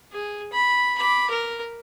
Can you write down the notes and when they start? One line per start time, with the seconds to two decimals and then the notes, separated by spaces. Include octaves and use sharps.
0.12 G#4
0.53 B5
0.98 B5 D6
1.30 A#4